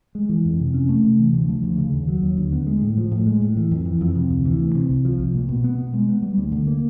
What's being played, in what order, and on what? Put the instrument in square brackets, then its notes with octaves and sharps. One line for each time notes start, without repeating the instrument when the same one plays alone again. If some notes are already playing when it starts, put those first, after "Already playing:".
[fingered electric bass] G#3
E3
F2
C3
C#4
A3
C3
E3
D2
F3
D2
C#3
D#2
F#3
D#2
D3
B3
G#3
A2
F3
A2
G#3
A2
E3
F2
E3
F2
C3
D2
E3
D2
C3
C2
F3
C2
A#2
B2
B3
B2
G#3
B3
G3
D2
D3
A#3